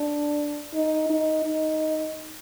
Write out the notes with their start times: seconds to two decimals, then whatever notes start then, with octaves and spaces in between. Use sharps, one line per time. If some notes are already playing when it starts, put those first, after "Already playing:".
Already playing: D4
0.74 D#4
1.10 D#4
1.46 D#4